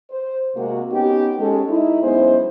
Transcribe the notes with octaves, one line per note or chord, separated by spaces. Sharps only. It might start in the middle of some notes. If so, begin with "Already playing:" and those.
C5
C3 G#3 A#3 F#4
B3 C#4 D#4 G4
G#3 C#4 A4
D#4 E4
F#2 G#3 B3 E4 C5